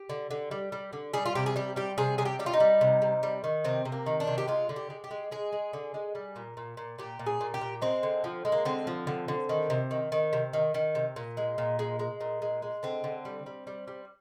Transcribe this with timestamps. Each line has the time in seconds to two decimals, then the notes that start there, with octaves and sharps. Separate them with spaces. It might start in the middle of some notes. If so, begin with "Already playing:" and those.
Already playing: G4
0.10 D3
0.31 D3
0.51 G3
0.72 G3
0.93 D3
1.14 G3 G#4
1.26 F4
1.35 C3 G4
1.46 G#4
1.56 G3 G4
1.76 G3 G4
1.98 C3 G#4
2.18 C3 G#4
2.25 G4
2.39 G3 G4
2.46 F4
2.54 D#4
2.60 G3
2.81 C3
3.02 C3
3.23 G3
3.44 D#3
3.64 C3 C4
3.85 C3
3.92 A#3
4.06 D#3
4.20 D4
4.27 C3
4.38 G4
4.48 G#3 F4
4.69 D3
4.76 G4
4.90 G#3
5.04 G4
5.11 G#3
5.31 G#3 G#4
5.52 G#3
5.73 D3
5.94 G#3
6.15 G3
6.36 A#2
6.57 A#2
6.77 A#2
6.99 A#2 G4
7.19 A#2
7.26 G#4
7.41 A#2
7.54 G4
7.61 A#2
7.82 G#3 C4
8.03 D3
8.24 F3
8.45 G#3
8.52 A#3
8.65 D3 C4
8.87 F3
9.07 D3
9.28 D3
9.49 D#3
9.70 C3
9.91 D#3
10.12 D#3
10.33 C3
10.53 D#3
10.74 D#3
10.95 C3
11.16 A#2
11.37 G#3
11.58 A#2
11.79 G#3
11.99 G#3
12.21 A#2
12.42 G#3
12.62 G#3
12.83 D3 C4
13.04 D3
13.25 G3
13.46 G3
13.67 G3
13.88 G3